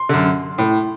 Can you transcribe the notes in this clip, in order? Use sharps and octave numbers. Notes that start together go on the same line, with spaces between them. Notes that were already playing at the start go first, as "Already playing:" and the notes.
Already playing: C6
F#2 D3
A2